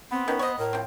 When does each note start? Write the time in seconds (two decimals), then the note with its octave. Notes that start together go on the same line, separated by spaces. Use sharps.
0.11 B3 C4
0.28 D#3 C#4 B4
0.39 C5 C#5 D#5
0.59 A2 A#4
0.73 F3 C4